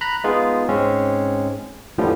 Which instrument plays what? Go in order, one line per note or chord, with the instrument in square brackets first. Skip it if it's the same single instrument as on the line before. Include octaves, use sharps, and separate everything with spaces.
[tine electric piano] A#5 B5 F#6
G#3 B3 D#4 F4 G#4
G#2 G#3 C4 C#4
F2 A2 D3 E3 F3 G3